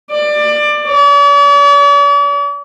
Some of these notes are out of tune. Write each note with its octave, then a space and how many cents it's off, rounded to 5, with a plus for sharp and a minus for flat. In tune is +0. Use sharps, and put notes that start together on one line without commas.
D5 +20
D5 -45